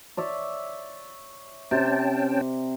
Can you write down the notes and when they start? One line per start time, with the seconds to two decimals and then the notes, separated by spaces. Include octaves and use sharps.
0.17 C#5 D5 E5
1.71 C3 C#4 G5 A5